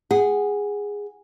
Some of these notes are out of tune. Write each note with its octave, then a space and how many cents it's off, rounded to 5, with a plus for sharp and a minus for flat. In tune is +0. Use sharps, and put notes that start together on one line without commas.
G#4 -10 F#5 +0